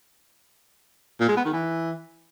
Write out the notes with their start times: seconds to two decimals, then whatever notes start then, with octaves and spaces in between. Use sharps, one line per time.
1.20 A#2
1.28 G#3
1.37 B3
1.45 D#3
1.53 E3